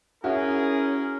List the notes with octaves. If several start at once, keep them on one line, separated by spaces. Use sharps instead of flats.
C#4 E4 F#4 G#4 A#4 E5